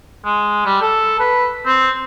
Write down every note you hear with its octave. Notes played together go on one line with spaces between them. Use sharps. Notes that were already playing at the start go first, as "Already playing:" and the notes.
G#3
G3
A4
B4
C4